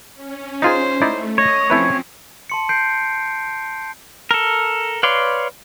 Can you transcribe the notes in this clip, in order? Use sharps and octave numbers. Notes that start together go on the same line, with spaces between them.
C#4
D#4 F4 G#4 C5
A3 D#4 E4 D5
C#5 D#5 D#6
F3 A3 C4 C#4 E4 B4
A5 C6 C#7
G6 C7 D7
A4 A#4
B4 C#5 D5 F5 C6